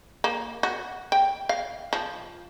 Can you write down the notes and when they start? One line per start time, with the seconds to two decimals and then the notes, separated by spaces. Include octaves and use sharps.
0.24 A#3
0.63 F#4
1.12 G5
1.49 F5
1.93 F3